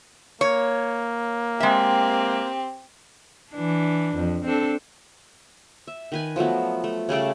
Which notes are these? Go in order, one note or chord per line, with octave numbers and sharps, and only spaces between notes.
A#3 C#5
G#3 C4 G4 E5
E3 D4
F2
C4 D4 A4
E5
D#3 B4 G#5
F3 F#3 A3 B3
A3
C#3 G3 A3 D5